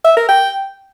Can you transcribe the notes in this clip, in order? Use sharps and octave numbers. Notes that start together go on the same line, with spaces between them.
E5
A#4
G5